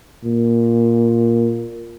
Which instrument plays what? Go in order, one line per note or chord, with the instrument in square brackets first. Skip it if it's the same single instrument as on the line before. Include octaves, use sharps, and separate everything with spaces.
[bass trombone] A#2